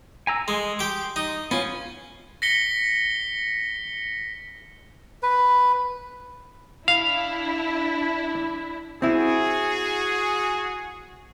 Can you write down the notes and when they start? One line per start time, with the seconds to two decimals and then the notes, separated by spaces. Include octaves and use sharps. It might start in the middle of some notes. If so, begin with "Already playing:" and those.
0.27 G#5 A#5 E6
0.48 G#3 C6
0.79 G4 D6
1.16 D#4
1.51 B3 C#4 F4
2.42 A#6 B6 C#7 G7
5.23 B4
6.88 D4 E4 F5
9.02 C4 E4 F#4 G#4